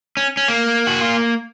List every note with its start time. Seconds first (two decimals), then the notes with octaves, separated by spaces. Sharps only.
0.17 C#4
0.37 C#4
0.48 A#3
0.87 F#4
1.01 F4